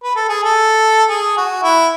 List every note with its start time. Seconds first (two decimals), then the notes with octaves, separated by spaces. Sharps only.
0.03 B4
0.16 A4
0.29 G#4
0.43 A4
1.09 G#4
1.37 F#4
1.63 E4